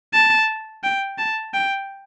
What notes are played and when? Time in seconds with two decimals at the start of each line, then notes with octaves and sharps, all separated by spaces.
0.14 A5
0.84 G5
1.18 A5
1.54 G5